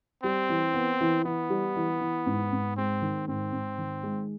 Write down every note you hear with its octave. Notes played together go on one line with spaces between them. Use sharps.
G3 C4
E3
B3
E3
E3 B3
G3
E3
E3
G#2
G#2
G#3 C4
D#3
G#2 C4
G#2
D#3
G#3